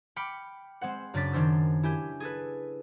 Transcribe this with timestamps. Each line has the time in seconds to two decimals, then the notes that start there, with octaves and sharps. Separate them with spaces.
0.16 G5 B5 D6 F6 C#7
0.81 G#3 C4 C5 F#5
1.14 F#2 C#3 D4 D6 A6 B6
1.32 D#3 C#4 D4 C5 E6
1.83 E4 G4 G#5 G6
2.20 G#4 A4 B4